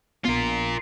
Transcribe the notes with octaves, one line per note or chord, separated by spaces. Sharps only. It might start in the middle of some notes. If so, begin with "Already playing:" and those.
A#1 B3 F4 A#4